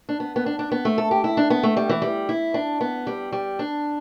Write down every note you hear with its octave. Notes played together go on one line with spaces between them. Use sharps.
D4
B3
B3
D4
D4
B3
A3
A4
G4
E4
D4
B3
A3
G3
E3
G3
E4
D4
B3
G3
G3
D4